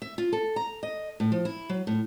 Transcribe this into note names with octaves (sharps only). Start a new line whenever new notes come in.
E5
F4
A4
A#5
D#5
A2
F3
E4
F#3
A2